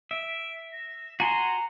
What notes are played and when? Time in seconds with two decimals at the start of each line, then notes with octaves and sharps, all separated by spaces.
0.11 E5 D7
0.72 A#6
1.20 F#4 G#5 A#5 C6